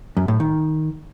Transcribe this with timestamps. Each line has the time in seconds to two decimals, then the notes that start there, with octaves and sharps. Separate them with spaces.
0.17 F#2
0.28 A2
0.40 D#3